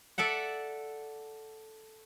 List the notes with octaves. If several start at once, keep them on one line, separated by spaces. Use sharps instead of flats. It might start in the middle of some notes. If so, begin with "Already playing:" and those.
A4 D5 E5 F#5